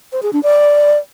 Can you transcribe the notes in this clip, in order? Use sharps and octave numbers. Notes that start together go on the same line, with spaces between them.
C5
G#4
D4
D5